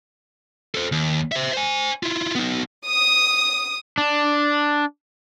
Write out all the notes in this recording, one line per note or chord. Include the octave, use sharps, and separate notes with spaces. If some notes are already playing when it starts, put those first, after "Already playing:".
A4 C5
D#2
C5 E5
C5 G#5
E4 F4
B3 D#4
D#6
D4